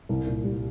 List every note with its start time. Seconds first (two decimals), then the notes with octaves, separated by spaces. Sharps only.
0.09 C2
0.27 A#2
0.44 G3